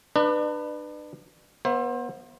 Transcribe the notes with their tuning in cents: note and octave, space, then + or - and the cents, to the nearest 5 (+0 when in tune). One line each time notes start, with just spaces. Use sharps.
D4 +35 B4 +0 D5 +45
B3 -25 C5 +30 E5 +30